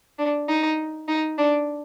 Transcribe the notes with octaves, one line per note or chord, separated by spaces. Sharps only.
D4
D#4
D#4
D4